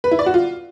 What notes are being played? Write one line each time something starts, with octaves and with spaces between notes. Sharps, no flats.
B4
E4
D5
F#4
F4